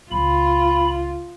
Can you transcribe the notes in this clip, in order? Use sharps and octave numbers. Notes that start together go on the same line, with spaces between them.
D#1 C#2 F4 B5